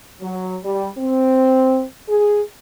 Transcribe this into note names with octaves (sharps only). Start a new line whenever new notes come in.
F#3
G3
C4
G#4